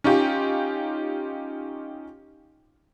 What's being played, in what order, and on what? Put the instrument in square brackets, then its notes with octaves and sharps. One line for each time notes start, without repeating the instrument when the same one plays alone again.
[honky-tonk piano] C#4 D#4 F4 G4